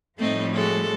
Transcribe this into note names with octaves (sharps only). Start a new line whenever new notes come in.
A2 F3 G3 A3 C4 D#4
G#3 F#4 A4